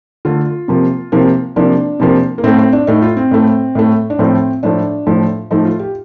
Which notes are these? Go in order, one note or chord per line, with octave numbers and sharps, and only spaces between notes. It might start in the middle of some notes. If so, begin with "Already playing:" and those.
D3 A3 F4
C3 F3 A#3
C3 F3 A#3
C3 F3 A#3 D4
C3 F3 A#3
A#3
A2 A3 C4
C4
D4
A2 A3 D#4
F4
C4
A2 A3
A2 A3
D4
A2 F3 A3 C4
A2 F3 A3 D4
A2 F3 A3
A2 F3 A3 D#4
F4
G4